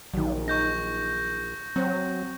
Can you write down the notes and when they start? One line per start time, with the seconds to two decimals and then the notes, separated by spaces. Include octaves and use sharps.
0.14 A#1 D#3 F#3
0.48 D#4 C#6 G6 A#6
1.76 F#3 C4